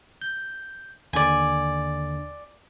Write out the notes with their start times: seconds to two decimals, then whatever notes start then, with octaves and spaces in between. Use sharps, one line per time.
0.22 G6
1.13 D#2 D3 D5 G#5